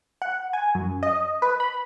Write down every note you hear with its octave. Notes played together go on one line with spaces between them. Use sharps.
F#5
G#5
F#2
D#5
B4
B5